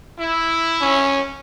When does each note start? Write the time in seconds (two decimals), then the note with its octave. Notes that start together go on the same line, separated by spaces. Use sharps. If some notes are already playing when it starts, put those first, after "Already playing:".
0.18 E4
0.82 C#4